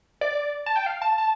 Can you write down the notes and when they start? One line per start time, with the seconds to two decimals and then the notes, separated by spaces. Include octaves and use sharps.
0.21 D5
0.66 A5
0.76 G5
0.86 F5
1.02 A5
1.18 A5